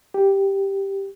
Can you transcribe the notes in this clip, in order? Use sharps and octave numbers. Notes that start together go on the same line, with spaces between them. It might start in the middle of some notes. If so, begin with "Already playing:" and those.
G4